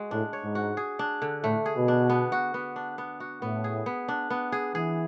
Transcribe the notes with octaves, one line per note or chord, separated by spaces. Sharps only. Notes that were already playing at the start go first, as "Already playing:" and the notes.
Already playing: G#3 F#4
A2 D4
C#5
G#2
F#4
G#4
D4
D3
A2 A3
G#4
B2
D4
B3
F#4
B3
D4
B3
F#4
A2 B3
G#4
B3
D4
B3
G#4
E3 G#4